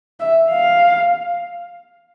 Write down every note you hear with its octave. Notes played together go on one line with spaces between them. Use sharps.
E5
F5